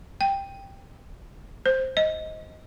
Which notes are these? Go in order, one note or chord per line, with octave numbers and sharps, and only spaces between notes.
G5
C5
D#5